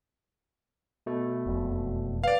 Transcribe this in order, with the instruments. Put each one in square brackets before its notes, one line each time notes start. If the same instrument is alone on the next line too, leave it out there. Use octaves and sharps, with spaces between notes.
[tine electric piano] B2 A3
[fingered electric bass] E1 F2
[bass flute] B4 [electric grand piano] D5 F5